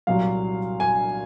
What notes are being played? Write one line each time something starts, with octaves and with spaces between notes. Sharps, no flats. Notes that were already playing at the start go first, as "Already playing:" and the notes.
C2 A#2 F#3 F5
G#5